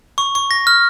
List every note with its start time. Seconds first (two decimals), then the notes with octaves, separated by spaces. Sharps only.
0.18 C#6
0.35 C#6
0.51 A#6
0.67 F6